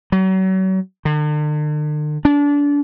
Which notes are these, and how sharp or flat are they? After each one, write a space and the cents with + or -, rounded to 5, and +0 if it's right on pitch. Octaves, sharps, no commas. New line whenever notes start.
F#3 +35
D3 +45
D4 -30